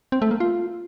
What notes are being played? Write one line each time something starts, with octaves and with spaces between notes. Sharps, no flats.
C4
A3
A#3
F4